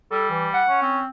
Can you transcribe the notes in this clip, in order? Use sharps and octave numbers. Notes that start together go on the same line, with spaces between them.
G3 A4
E3
F#5
C#4
C4